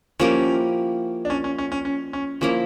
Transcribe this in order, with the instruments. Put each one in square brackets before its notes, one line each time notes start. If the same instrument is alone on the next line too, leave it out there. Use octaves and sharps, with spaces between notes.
[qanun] F3 A#3 E4 G4 [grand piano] C#4
[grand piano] D4
C#4
C#4
C#4
C#4
C#4
C#4
[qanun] F3 A#3 E4 [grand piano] C#4